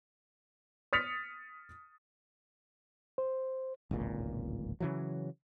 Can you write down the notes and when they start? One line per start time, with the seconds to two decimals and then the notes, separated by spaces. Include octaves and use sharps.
0.93 D#6 F6 A6 B6 C#7 F7
3.18 C5
3.91 D1 G#1 C#2 A#2
4.80 C#3 E3 F#3